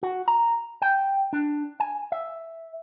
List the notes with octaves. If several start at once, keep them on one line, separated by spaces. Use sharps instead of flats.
F#4
A#5
G5
D4
G#5
E5